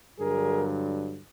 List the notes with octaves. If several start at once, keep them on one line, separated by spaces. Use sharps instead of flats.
G2 D3 F#3 G#4 A#4